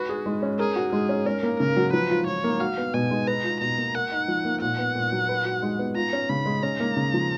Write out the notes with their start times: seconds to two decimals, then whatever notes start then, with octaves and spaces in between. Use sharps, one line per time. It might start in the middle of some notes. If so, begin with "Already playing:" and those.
Already playing: F#4 B4
0.09 G#4
0.26 G#3
0.42 C#4
0.59 G#4 A#4
0.76 F#4
0.92 G#3 G#4
1.09 C#4
1.26 C#4 A#4
1.43 A#3
1.60 C#3 A#4
1.77 F#3
1.93 F3 B4
2.10 F4
2.27 F3 C#5
2.44 A#3
2.60 F#4 F5
2.77 B3
2.94 B2 G#5
3.11 G#3
3.27 B4 A#5
3.44 F4
3.61 B2 A#5
3.78 A#3
3.95 A#4 F#5
4.11 D#4
4.28 F3
4.45 A#3
4.61 A#2 F#5
4.79 B3
4.95 A#2
5.12 F#3
5.29 B4
5.45 F#4
5.62 G#3
5.79 B3
5.96 F4 A#5
6.13 C#4
6.29 C#3 B5
6.46 G#3
6.63 C#4 A#5
6.80 A#3
6.97 C#3
7.14 F3